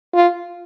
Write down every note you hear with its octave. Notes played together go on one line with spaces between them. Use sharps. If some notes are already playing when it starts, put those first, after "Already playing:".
F4